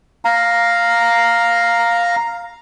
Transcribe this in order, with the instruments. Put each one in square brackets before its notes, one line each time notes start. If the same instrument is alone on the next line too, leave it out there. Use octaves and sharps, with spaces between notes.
[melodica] F5 A#5